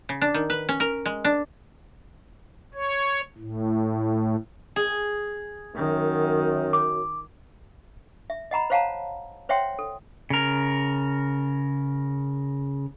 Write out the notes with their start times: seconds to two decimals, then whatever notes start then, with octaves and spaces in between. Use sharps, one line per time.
0.09 C#3
0.21 D4
0.34 D#3
0.50 B4
0.69 C#4
0.80 A#4
1.05 G#3
1.24 D4
2.74 C#5
3.38 A2
4.76 G#4
5.76 F#2 D#3
6.73 D6
8.30 E5
8.51 D#5 F#5 A#5 B5
8.70 C5 C#5 F5 F#5 A5 A#5
9.49 C5 C#5 E5 F#5 G5 C6
9.79 A4
10.30 C#3 A#4